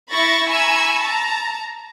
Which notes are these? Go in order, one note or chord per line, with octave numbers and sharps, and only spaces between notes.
E4 E5 B5 C#6 A6 A#6
G#5 A#5 B5 C#6 E6
A5 A#5